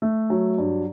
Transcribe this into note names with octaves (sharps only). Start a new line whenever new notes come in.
A3
F#3
G2